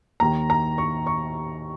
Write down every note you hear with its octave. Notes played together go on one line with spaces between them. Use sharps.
D#2 D#3 A#5
A#5
C#6
C#6